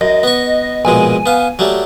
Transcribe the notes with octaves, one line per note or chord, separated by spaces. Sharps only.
F#2 D#5
B3 C#6
A#1 B2 G#3 G#5
B3 F5
F#3 G3 A3